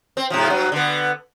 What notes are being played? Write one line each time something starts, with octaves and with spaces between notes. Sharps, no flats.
C4
G#2 C3 F3
G2 F#3
D3 B3